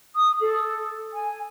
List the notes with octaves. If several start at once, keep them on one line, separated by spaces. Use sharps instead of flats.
D#6
A4
G#5